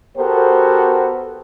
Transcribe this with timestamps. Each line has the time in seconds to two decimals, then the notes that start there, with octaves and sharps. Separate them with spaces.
0.18 B3 F#4 G4 A4 A#4 C5